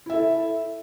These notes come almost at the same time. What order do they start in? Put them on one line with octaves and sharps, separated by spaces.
E4 E5 A4